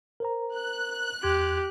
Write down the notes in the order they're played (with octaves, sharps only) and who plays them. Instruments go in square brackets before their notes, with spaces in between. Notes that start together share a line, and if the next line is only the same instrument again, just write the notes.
[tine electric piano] A#4 C5 A#5
[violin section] F#6
[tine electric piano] E2 C6 G#6 [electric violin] G4